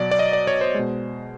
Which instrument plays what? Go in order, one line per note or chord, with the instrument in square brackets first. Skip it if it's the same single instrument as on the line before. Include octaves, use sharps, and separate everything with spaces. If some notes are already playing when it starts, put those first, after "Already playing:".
Already playing: [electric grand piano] B2 F#3 D5
D5
D#5
D5
C#5
C5
B2 G#3